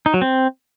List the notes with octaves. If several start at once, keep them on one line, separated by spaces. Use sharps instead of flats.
D#4
F#3
C4